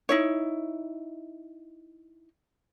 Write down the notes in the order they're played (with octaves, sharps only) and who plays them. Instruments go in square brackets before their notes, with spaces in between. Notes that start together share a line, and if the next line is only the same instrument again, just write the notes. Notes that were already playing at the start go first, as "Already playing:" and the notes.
[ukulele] D#4 E4 C#5